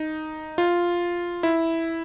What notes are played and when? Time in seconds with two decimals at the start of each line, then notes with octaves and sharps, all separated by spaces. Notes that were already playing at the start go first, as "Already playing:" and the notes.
Already playing: D#4
0.58 F4
1.43 E4